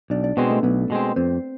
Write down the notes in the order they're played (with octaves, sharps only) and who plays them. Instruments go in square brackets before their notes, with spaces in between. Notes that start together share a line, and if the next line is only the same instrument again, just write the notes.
[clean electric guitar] B1 [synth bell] D4 D5
[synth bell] D4 D5
[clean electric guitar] B2 G#3 C4 [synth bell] B3 B4
[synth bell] A3 A4
[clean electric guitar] B1 [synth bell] B3 B4
[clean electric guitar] B2 G#3 C4
[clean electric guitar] F2 [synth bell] C4 C5